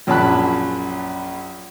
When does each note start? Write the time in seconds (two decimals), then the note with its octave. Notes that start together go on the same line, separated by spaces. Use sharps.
0.07 A#1 F#2 C#4 A5 B5 F#6